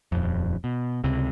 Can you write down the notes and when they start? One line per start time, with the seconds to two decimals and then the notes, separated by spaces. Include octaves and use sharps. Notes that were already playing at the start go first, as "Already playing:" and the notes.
0.12 D#1 F2
0.64 B2
1.04 C#2 C3